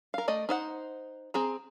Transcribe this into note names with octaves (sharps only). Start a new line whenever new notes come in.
A#4 F5
A3 D5 D#5
D#4 C5 F#5
C4 G#4 A#5